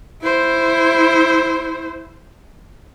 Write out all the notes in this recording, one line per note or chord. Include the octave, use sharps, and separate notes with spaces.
E4 C5